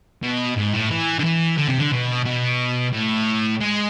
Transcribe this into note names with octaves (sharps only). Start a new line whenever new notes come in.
B2
G#2
A2
E3
D3
E3
D3
C3
D3
B2
B2
A2
G#3